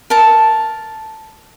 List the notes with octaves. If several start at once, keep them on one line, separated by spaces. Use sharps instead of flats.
A#4 A5